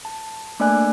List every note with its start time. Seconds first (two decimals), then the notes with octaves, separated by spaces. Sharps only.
0.05 A5
0.60 A3 A#3 D4 D5 G#5 F#6